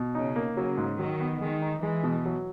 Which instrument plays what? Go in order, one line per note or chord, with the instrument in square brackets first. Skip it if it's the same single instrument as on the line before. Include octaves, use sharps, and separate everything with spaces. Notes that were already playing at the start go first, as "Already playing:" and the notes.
Already playing: [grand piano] B2
[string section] C#3 [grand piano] D#4
[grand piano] A#3
[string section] C#3 [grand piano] F#3
[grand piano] G#2
[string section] D#3 [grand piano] F#3
[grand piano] B3
[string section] D#3 [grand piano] G#3
[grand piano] D#4
[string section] E3 [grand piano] G#3
[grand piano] B2
F#3